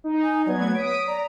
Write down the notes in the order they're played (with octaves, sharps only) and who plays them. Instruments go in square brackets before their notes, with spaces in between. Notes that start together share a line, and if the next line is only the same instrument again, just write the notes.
[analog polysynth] D#4
[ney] G#5
[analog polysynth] F#3 B3 G#6 [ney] D5
[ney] A3
[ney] C#5 [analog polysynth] D#6 B6 D7
[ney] D5 [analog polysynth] A#5